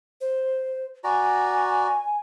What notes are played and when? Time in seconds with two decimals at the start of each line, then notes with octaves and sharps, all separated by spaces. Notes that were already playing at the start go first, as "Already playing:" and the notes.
0.21 C5
1.04 F#4 D5 G#5 A#5